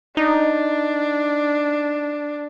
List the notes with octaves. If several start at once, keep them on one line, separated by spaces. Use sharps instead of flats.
D4 D#4